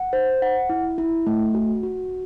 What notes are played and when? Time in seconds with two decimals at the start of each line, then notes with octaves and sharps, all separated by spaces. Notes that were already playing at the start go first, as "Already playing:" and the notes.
Already playing: F#5
0.13 C5
0.42 F#5
0.69 E4
0.98 E4
1.27 A3
1.55 F#4
1.83 F#4